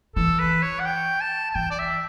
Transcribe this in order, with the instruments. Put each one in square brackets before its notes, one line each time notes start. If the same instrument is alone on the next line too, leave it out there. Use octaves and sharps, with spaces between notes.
[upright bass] E3 [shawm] A4
[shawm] B4
C#5
F#5
G5
A5
A5
[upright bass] E3 [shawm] G5
[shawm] D5
E5